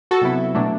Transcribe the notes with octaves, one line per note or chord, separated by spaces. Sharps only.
F#4 A4
C3 F#3 B3 E4
B2 F#3 A3 D4